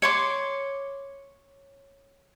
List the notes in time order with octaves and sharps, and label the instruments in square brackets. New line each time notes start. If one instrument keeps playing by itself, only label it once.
[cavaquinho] C#5 C6 D6